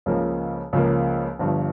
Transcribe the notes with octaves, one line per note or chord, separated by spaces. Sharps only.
C#2 C#3 F3 A#3
C#2 C#3 F3 A#3
G1 G2 F3